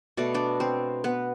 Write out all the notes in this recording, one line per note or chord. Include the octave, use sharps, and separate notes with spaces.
B2 A3 D5
D4 D5
C4 C5
B3 B4